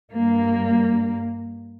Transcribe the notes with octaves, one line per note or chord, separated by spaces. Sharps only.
G2 A#3